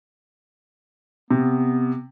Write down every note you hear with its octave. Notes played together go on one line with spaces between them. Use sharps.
C3 B3